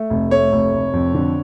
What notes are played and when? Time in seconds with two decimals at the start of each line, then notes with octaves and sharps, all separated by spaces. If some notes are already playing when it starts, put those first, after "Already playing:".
Already playing: A3
0.10 F1
0.31 A3 C#5
0.52 F1
0.73 F1
0.93 F2
1.14 D3